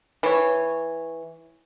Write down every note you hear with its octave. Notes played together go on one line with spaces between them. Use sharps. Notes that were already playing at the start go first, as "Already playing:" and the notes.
E3 C#5